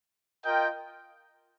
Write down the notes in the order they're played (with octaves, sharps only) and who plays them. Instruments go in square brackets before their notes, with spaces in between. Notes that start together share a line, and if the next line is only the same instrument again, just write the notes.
[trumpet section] F4 A#4 D#5 G5